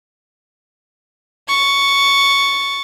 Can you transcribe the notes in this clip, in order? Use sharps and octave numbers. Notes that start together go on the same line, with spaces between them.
C#6 A6